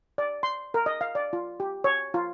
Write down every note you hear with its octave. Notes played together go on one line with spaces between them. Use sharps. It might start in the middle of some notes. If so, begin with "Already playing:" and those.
D5
C6
A#4
D#5
F5
D5
F4
G4
C#5
F4